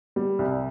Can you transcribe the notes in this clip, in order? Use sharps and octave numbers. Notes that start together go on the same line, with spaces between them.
G3
C2